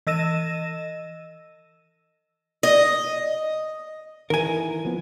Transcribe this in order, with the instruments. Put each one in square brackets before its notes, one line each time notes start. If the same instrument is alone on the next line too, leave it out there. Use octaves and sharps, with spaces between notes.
[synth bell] E3 D#5 E6 A#6 D#7 E7
[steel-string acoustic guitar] D#5
[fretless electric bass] D#3 E3 [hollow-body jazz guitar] A#4 G#5
[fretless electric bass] F3 B3